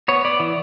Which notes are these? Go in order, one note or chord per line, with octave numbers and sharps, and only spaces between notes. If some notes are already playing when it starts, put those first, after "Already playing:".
B3 C#5
B3 D5
E3